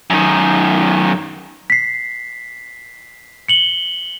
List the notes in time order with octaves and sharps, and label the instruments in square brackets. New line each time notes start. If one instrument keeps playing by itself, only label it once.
[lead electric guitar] F#2 D#3
[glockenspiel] B6 C7
C#7 F#7 G7